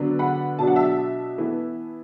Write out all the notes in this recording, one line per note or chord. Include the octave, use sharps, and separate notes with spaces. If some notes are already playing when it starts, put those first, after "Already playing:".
Already playing: D3 F#3 B3 D4
F#5 B5
B2 F#3 D4 A5
F#5
E5 A5
E3 B3 E4